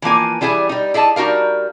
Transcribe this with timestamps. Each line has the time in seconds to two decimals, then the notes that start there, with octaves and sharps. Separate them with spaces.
0.02 E3 F3 A#3 G#5
0.41 E3 G3 E4 G#4 G#5
0.69 G3 D#4
0.94 E4 G#4 D#5 A5
1.16 G3 D#4 F#4 A#4 F5